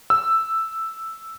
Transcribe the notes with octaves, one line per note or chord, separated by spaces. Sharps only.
E6